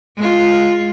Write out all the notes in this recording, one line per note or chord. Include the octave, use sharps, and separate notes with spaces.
G#3 F4